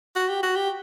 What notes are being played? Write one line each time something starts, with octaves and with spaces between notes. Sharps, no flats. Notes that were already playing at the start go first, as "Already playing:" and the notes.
F#4
G4
F#4
G4